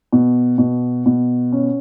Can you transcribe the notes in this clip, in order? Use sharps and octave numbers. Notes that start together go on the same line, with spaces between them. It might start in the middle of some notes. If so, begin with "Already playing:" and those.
B2
B2
B2
C#4